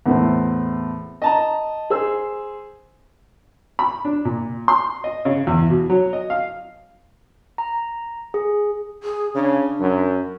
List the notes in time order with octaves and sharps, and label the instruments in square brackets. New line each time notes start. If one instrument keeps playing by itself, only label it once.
[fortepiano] E2 A2 C4
D#5 A5 A#5
G#4 C5 E6
B5
D4
A#2
C6
D#5
C#3
E2
B2
F#3
D#5
F5
[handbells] A#5
G#4
[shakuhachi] G#4
[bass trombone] C#3 [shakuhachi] D4
[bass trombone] F#2